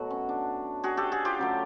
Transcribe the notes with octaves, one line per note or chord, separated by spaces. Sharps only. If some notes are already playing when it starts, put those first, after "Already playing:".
Already playing: B2 F#3 A3 F#4
C#4
D4
F#4 G#4
G4 A4
F#4 G#4
F4 G4
C#3 F#3 A3